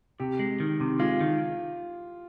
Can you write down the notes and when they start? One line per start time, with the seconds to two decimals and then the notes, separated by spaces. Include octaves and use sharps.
0.20 C3 G4
0.39 G#3
0.60 D#3
0.80 C3
1.00 G#3 F4
1.21 D#3